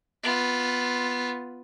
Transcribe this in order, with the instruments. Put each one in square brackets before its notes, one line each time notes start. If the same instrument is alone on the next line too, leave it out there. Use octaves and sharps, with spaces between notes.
[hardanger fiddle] B3 F4